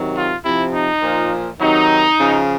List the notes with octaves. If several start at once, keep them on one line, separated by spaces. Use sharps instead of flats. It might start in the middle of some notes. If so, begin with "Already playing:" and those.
Already playing: C3 D#3 F#3
F4
C3 F3 E4
D#4
A#2 F3
C3 D#3 F#3 D#4
C#3 F3